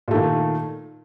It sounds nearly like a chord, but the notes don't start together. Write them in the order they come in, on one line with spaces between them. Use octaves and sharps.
A#2 A3 D#3